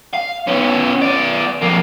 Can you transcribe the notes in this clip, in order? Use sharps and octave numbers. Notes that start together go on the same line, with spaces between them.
F5
B3 C#4
B3 D5
F2 A#3